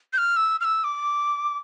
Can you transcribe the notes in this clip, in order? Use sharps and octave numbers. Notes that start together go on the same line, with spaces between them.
G6
F6
E6
F6
E6
D6